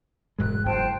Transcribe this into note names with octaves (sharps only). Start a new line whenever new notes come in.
E1 G#2 G#3 F#6
F#1 C5 G5 A5